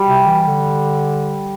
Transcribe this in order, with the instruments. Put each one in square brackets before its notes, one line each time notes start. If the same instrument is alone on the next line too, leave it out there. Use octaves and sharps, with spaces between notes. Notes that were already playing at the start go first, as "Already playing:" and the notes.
Already playing: [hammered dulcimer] G3
[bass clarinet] C3
E3
D3